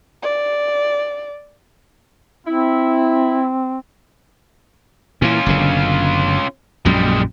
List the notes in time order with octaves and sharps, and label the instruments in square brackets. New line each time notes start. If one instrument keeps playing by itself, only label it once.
[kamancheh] D5
[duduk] C4 [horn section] E4
[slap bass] A#2 E3 [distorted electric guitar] C#4 F4
[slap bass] F#1 B2 D3
[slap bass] A#1 F#2 A#2 [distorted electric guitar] G3 G#3